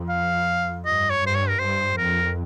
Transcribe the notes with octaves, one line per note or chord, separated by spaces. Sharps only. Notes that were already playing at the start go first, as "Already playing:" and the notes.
Already playing: F2
F5
G2 D#5
C#5
G2 C5
C#5
A#4
G2 C5
F2 A#4